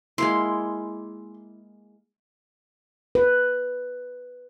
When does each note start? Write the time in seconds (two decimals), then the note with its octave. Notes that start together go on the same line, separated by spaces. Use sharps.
0.18 G#3 A#3 E4 C6
3.15 B4